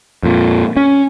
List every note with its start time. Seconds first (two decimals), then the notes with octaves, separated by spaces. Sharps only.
0.23 F2 A#2
0.77 C#4